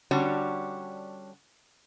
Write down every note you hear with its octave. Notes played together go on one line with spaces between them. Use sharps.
D3 G3 C#4 D4 F#4 C#5